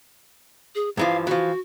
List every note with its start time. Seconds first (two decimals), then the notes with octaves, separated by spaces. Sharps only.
0.75 G#4
0.97 G2 E3 F3 F5
1.27 E3 F3 F#4